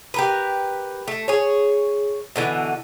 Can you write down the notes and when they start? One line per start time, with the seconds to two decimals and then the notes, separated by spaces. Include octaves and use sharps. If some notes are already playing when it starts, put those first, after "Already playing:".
0.14 G4 A#4 B4
1.08 A3
1.28 G#4 C#5
2.36 B2 D3 E3